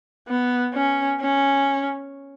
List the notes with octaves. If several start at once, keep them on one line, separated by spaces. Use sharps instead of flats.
B3
C#4
C#4